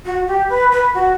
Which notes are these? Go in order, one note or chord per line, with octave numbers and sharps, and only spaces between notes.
F#4
G4
B4
B4
F#4